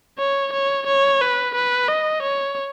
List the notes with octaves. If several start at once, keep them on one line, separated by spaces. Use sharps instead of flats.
C#5
C#5
C#5
B4
B4
D#5
C#5